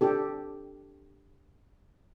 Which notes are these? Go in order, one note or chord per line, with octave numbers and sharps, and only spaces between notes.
D4 G4 A4